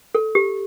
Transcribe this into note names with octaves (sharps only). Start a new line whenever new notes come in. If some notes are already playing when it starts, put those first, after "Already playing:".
A4
G4